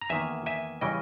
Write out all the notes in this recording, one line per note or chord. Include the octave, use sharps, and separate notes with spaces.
A#5
E2 D#3 A#3 E5 G#5
E5 G#5
C#3 E3 G3 C#4 D#5 G5